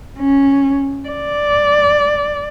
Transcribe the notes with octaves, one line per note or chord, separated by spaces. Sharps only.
C#4
D5